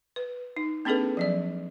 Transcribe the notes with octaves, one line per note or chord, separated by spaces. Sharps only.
B4
D#4
A#3 C4 D4 G#4 A4 B4
F3 F#3 D5